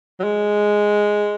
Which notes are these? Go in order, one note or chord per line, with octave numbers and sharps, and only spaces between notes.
F#3
G#3